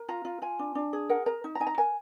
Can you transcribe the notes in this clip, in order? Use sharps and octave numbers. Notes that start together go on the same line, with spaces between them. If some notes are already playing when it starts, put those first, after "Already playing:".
Already playing: A#4
F4 A#5
F4
F4 G#5
D4
D4
G#4
A#4 F#5
A#4 A#5
D#4
A#5
D#4 G#5
A#5
A#4 G#5